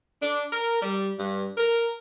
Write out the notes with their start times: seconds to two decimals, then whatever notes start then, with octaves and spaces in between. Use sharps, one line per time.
0.22 D4
0.53 A#4
0.82 G3
1.19 G2
1.57 A#4